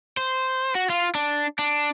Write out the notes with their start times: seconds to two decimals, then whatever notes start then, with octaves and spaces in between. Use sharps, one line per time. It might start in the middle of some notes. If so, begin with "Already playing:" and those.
0.17 C5
0.75 F#4
0.90 F4
1.15 D4
1.59 D4